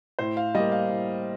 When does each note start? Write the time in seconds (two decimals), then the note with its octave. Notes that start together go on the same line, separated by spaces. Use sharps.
0.19 A2 C5
0.37 F5
0.55 G3 A#3 D#5
0.72 F5
0.90 A2